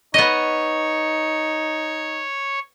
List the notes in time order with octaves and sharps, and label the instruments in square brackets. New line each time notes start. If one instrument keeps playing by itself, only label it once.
[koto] B3 D#5 [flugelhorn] D#4 [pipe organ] C#5